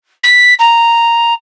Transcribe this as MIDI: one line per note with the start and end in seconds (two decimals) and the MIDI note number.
0.23 0.54 95
0.59 1.34 82